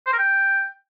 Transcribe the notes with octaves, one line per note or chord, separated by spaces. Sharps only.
C5
A#4
G5